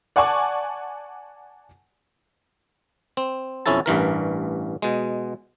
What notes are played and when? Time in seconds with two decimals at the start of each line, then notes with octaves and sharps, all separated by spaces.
0.16 D5 F#5 G#5 A5 C#6 D6
3.17 C4
3.66 B1 F2 C#4 E4 A4 A5
3.86 A1 G2 E3 A#4
4.82 B2 G#3